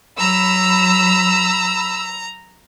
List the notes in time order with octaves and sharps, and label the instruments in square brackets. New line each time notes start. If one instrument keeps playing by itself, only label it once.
[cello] F#3 [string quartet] A#5 [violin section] B5 E6